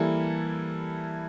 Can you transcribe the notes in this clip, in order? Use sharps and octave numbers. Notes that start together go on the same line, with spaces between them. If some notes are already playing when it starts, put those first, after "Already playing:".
Already playing: E3 G3 A#3 E4 A4